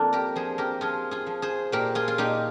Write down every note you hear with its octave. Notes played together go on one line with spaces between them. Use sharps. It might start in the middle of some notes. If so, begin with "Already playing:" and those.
Already playing: F2 A#3 D4
G4 A#4
F3 G#4 C5
G4 A#4
F3 F4 G#4
F4 G#4
F3
G#4 C5
A#2 G4 A#4
F4 G#4
F4
A#2 D#4 G4